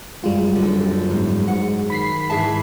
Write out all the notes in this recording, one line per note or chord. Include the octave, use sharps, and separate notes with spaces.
F#2 G3 G#3 F4
D#1 D3
E2 G#2
G#2 F#5
D#3 B5 B6 C7
G#2 E3 G#4 E5 A5